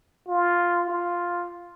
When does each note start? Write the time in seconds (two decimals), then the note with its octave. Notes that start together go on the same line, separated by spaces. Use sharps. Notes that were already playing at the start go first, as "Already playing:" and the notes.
0.28 F4
0.90 F4